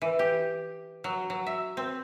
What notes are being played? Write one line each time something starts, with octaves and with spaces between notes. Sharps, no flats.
E3
G4
F#3
F#3
E5
C4